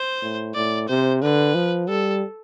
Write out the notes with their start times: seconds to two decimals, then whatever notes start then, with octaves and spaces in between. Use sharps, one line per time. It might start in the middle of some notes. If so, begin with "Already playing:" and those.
Already playing: C5
0.22 A2
0.55 A2 D5
0.89 C3 C5
1.22 D3 B4
1.55 F3
1.89 G3 A4